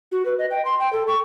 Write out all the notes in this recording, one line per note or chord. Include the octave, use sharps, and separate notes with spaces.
F#4
B4
D#5
G5
C6
G5
A4
C#6